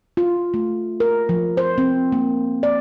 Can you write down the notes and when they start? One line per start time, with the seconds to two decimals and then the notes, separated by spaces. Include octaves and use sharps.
0.17 F4
0.54 A3
1.00 A#4
1.29 F3
1.57 C5
1.78 C4
2.12 A#3
2.63 D5